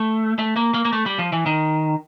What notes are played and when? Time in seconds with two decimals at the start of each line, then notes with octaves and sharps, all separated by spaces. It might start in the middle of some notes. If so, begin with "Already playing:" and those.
Already playing: A3
0.39 A3
0.56 A#3
0.74 A#3
0.85 A#3
0.93 A3
1.06 G3
1.19 F3
1.32 E3
1.46 D#3